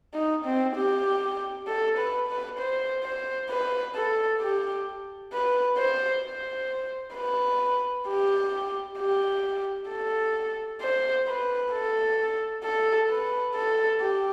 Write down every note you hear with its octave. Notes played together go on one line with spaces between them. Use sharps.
D#4
C4
G4
A4
B4
B4
C5
C5
B4
A4
G4
B4
C5
C5
B4
G4
G4
A4
C5
B4
A4
A4
B4
A4
G4